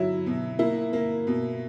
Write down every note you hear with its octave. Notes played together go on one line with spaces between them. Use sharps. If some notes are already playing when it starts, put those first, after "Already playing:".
Already playing: F#3 E4
B2
A#3 E4
A#3
B2